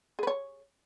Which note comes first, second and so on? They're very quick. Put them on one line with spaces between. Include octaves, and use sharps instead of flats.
G#4 B4 C#5